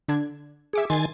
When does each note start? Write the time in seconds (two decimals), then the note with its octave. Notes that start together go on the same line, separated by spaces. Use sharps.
0.08 D3 D4 G#6
0.73 G#4 E5 D6 C#7
0.90 D#3 G#5 C6 A6